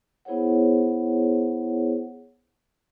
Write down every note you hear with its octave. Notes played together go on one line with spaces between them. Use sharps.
B3 E4 G#4 C5 C#5 F#5